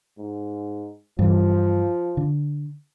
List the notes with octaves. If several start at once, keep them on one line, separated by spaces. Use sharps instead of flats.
G#2
G2 E3 F3
D3